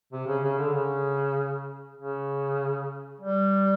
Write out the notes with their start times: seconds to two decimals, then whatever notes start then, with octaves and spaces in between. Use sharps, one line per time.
0.13 C3
0.27 C#3
0.44 C#3
0.59 D3
0.74 C#3
1.97 C#3
3.20 G3